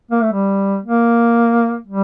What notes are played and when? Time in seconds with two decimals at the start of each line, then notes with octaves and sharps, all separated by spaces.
0.11 A#3
0.22 A3
0.33 G3
0.85 A#3
1.87 G3